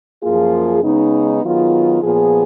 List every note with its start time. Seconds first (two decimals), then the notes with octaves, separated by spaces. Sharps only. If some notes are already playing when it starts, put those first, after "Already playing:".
0.22 F#2 F3 A#3 F4 G#4
0.82 C#3 G#3 B3 D#4
1.43 D#3 F#3 B3 F4 G#4
2.02 A#2 F3 B3 F4 G#4